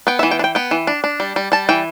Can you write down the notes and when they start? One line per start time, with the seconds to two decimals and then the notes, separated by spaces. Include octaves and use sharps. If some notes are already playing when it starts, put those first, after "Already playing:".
0.07 B3 G5
0.19 E5
0.23 E3
0.31 G5
0.39 D4
0.44 G5
0.55 B3 G5
0.71 E3
0.87 D4
1.04 D4
1.20 G3
1.36 G3
1.52 G3 A5
1.69 E3 G5